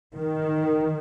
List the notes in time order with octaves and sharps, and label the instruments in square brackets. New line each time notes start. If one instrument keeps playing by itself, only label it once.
[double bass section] D#3